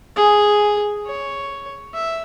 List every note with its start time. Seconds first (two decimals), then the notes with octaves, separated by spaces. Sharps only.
0.16 G#4
1.06 C#5
1.94 E5